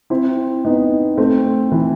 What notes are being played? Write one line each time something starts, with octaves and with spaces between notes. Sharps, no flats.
C4 E4
B3 D#4
A3 C4
E3